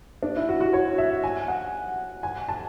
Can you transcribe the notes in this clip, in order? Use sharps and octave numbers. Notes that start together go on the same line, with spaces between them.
D4
E4
F#4
F#4
C#5
E5
G#5
F#5
G#5
A5